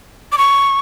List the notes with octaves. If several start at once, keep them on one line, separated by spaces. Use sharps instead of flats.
D6
C#6